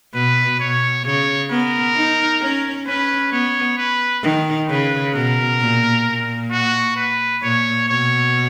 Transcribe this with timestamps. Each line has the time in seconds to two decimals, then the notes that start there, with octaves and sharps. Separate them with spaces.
0.14 B2 B4
0.59 B2 C#5
1.05 C#3 C#5
1.50 B3 A#4
1.96 D#4
2.42 C#4
2.87 C#4 B4
3.32 B3 C#5
3.77 B4
4.23 D#3
4.69 C#3 B4
5.15 B2 A#4
5.60 A#2
6.05 A#2
6.51 F#4
6.96 B4
7.42 A#2 C#5
7.88 B2 C#5